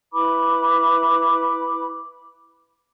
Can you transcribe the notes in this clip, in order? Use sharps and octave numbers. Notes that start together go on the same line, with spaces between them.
E4 B4 B5 D6